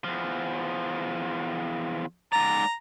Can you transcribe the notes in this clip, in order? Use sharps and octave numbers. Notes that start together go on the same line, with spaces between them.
E2 F3
G#2 D5 A#5